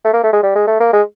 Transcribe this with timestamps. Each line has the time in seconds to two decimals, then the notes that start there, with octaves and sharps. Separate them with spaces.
0.05 A3
0.13 A#3
0.23 A3
0.33 G#3
0.43 G3
0.55 G#3
0.67 A3
0.80 A#3
0.93 G#3